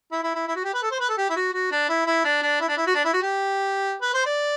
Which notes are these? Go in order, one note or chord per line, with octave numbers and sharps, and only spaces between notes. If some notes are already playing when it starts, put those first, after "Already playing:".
E4
E4
E4
E4
F#4
G4
B4
A4
C5
B4
A4
G4
E4
F#4
F#4
D4
E4
E4
D4
D4
E4
D4
E4
F#4
D4
E4
F#4
G4
B4
C5
D5